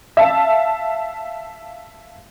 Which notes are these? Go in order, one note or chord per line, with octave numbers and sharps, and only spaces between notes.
E5 F5 A5